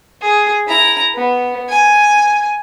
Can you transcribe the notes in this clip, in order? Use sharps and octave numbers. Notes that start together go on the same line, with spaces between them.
G#4
E4 A#5
B3
G#5